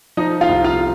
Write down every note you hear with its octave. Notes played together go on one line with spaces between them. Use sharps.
F3 D#4 D#5
F4 F5
C2
F4 F5